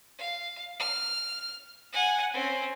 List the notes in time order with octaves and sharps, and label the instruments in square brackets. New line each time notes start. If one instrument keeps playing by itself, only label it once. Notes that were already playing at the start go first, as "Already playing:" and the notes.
[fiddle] F5
F6
F#5 G#5
C4 C#4